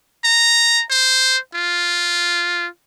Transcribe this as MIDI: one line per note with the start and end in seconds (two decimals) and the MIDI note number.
0.25 0.83 82
0.90 1.38 72
1.55 2.67 65